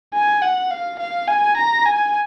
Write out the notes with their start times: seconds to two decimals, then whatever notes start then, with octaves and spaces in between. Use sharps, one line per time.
0.14 G#5
0.42 F#5
0.70 F5
0.99 F5
1.28 G#5
1.57 A#5
1.85 G#5